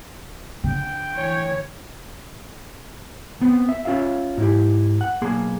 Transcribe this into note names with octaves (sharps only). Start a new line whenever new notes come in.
D3 G5
E3 C#5
B3 C4
E5
C#4 F4 E5 F5
G#2 E4 G4
F#5
B1 A#3 G#4 C6